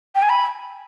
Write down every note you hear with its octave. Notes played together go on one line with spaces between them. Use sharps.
G5
G#5
B5